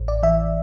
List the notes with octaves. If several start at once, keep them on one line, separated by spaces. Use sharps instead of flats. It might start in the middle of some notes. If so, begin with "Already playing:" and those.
Already playing: A1
D5
E3 E5